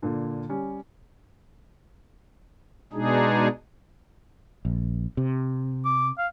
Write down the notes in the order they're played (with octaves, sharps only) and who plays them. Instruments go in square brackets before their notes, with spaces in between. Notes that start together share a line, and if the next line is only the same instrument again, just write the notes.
[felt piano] A#2 D3
G3 C#4
[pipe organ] B2 G#3 D4 D#4 G#4
[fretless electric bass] A#1
C3
[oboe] D6
F5